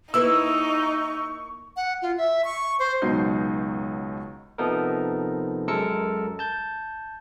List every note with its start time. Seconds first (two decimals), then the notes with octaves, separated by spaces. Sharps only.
0.14 A#3 D#4 E4 B4 C#6 E6
1.76 F#5
2.02 F4
2.18 E5
2.45 C#6
2.79 C5
3.02 C#2 B2 F#3 D#4 G6 C7
4.58 C3 F3 B3 D#4 A4 A#4
5.67 F#2 G#3 A4 A#4 E6 C#7
6.39 A5 G6